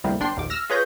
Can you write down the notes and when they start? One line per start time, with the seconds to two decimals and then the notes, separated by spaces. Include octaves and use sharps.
0.04 D2 A2 C3 G3 A#3
0.20 G1 D4 G5 C6
0.37 A#1 D#2 D6
0.50 E6 F6 A#6
0.70 F4 G#4 B4 C#5 G6 A#6